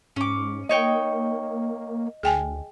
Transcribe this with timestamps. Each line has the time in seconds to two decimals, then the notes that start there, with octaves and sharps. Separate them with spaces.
0.16 G#2 C#4 D6
0.69 A#3 D#4 C#5 D#5 G5
2.23 D2 G#4 G5 G#5